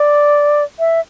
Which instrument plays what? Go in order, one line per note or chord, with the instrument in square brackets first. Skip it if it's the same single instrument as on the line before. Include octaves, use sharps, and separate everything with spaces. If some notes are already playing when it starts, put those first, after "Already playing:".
Already playing: [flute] D5
E5